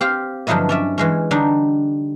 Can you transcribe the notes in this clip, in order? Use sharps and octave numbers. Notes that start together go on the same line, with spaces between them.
C4 G4 F5
G2 D3 F3 F#3 E4 D#5
C#4 D5 E5
E3 G#3 C#4
D3 G3 D4 D#4